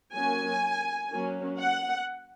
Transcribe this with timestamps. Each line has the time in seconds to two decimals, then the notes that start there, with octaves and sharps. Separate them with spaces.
0.14 F#3 A#3 C#4 G#5
1.11 F#3 A#3 C#4
1.60 F#5